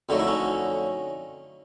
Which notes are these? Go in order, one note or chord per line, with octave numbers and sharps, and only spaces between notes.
F2 D3 F#3 A3 D#4
E4
C#4 D#4